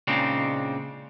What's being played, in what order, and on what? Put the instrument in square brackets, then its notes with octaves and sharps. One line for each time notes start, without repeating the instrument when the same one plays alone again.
[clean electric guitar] A#2 C#3 G#3 C4 D4 D#4